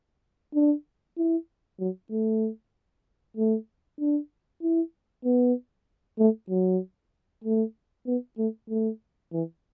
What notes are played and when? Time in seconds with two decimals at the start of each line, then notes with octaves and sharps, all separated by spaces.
0.54 D4
1.18 E4
1.80 F#3
2.11 A3
3.37 A3
4.00 D4
4.62 E4
5.25 B3
6.19 A3
6.50 F#3
7.44 A3
8.07 B3
8.38 A3
8.70 A3
9.33 E3